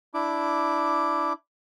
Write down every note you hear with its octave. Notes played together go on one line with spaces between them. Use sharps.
D4 E4 D6